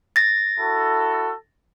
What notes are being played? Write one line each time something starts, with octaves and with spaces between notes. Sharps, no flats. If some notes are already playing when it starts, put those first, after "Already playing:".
A6 A#6
E4 F#4 A4